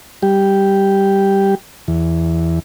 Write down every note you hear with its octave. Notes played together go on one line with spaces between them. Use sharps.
G3 G4
E2